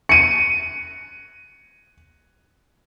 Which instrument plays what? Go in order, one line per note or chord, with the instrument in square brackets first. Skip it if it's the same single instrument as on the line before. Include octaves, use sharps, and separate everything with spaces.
[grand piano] C#7 D#7